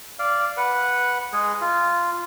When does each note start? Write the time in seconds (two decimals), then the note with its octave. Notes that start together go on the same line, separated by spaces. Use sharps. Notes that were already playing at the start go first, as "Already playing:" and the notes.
0.19 D5 F5
0.57 B4 F#5
1.33 G#3 G#4
1.61 F4